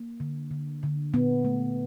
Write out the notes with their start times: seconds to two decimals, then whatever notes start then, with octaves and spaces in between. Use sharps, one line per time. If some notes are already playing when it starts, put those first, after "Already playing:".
Already playing: A#3
0.20 D3
0.51 D3
0.83 D3
1.13 A#2 B3
1.45 A3